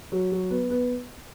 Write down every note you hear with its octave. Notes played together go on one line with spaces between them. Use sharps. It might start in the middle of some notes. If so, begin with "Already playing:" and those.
F#3
F#3
B3
B3